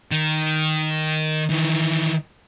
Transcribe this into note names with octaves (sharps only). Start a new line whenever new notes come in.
D#3
D#3 E3